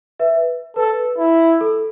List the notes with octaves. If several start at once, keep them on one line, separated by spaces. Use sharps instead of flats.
B4 E5
A4 B4
E4
A4